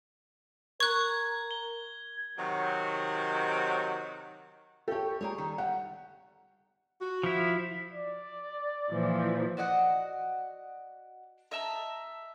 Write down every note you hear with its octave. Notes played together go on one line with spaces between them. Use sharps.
A#4 C#6 F#6 G#6
G7
C3 D#3 F#3
G4 A4 C#5 G5
G3 A#3 G#4 C#5
D#3 A4
G3 F#5
F#4
F3 E4
D5
A#2 E3 F3
F#4 D5 D#5 F#5
D#5 E5 A5 A#5